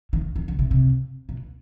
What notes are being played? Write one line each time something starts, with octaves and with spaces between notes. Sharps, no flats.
D#3
D#3
D3
C3
C3
B2